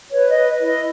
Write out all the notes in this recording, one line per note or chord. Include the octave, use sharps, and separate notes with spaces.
B4 C#5
D#5
B4
E4
D#5